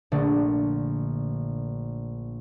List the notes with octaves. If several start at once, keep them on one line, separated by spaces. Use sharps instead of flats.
A#1 D3 A3